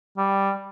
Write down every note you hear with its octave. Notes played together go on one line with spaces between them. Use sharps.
G3